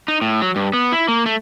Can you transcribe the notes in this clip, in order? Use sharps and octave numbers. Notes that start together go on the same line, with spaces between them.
D#4
A2
F#3
G2
B3
E4
A#3
A3